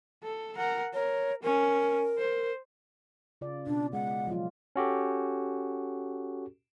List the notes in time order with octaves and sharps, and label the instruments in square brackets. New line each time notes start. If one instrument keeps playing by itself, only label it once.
[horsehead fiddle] A4
A#4 F#5
[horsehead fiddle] A#4 [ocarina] C#5
[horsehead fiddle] C#4 [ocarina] A#4
[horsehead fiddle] C5
[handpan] C#3 F4 D5
[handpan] B2 [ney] D4
[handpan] G#3 [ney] F#5
[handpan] F3 F#3 F4
[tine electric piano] C#4 F#4 G4 A4